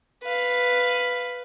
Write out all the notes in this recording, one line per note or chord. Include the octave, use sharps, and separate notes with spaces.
B4 F5